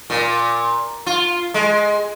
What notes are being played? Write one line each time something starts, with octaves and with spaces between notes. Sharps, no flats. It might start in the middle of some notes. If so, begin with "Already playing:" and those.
A#2
F4
G#3